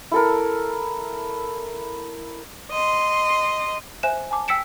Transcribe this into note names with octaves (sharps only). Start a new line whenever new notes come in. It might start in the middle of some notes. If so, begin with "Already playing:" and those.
E4 A4 A#4
D#5 C6
C5 E5 G#5 F#6 E7
G#5 A5 D6
G5 E6 B6 C#7 D7 E7